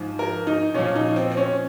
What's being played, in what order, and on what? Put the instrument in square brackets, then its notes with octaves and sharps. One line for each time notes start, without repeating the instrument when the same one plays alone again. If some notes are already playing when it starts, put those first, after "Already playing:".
Already playing: [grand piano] G#2 F3
A#4
D#4
A#2 F3 C#4
D#4
C4
C4
C#4